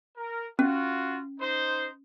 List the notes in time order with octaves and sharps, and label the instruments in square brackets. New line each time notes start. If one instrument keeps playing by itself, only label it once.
[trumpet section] A#4
[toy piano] C#4 [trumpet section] F4 F#4
[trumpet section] D#4 C5